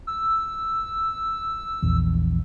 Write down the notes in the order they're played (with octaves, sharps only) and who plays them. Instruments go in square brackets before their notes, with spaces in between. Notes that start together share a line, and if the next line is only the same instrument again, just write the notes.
[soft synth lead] E6
[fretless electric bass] A#1 E2